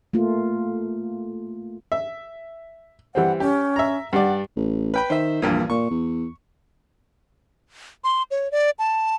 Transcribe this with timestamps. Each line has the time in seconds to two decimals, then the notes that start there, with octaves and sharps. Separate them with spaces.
0.13 A3 A#3 F4
1.92 E5
3.15 E3 G3 C4 F#5
3.40 C#4 G4
3.76 E5 A#5
4.13 G2 D5 F#5
4.56 A1
4.94 B4 G5 B5
5.10 D#3 C5 E5
5.42 A#1 E2 G2 A#2
5.70 A#2 C#6
5.90 E2
8.04 C6
8.31 C#5
8.51 D5
8.79 A5